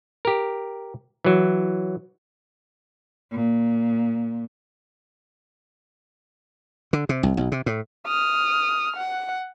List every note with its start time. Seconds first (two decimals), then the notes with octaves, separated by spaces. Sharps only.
0.25 G4 A#4
1.25 E3 F#3
3.32 A#2
6.93 D3
7.09 C3
7.23 C2
7.37 B1
7.52 C3
7.66 A2
8.07 D#6 F6
8.97 F#5